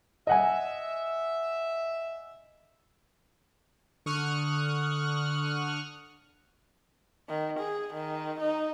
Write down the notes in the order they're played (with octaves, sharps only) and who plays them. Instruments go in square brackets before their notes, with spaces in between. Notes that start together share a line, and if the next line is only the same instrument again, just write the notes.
[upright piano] D#5 F#5 G#5 [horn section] E5
[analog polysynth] D3 C#6 D#6 F6 F#6
[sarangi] D#3
G#4
D#3
D#4